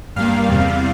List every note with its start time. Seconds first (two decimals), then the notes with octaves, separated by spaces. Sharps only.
0.16 G2 G3 A#3 F5
0.49 E2 C3 G3